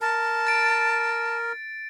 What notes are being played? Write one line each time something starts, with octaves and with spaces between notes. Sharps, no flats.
A#4 A5
A6 D7